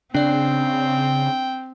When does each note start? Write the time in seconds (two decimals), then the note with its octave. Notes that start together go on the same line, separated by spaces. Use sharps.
0.14 C#3 C4 D4 D5 G5